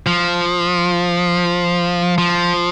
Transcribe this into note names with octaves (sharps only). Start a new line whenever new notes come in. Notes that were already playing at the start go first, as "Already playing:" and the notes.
F3
F3